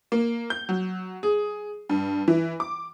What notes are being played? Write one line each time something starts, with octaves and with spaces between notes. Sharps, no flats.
A#3
G6
F#3
G#4
G2
E3
D6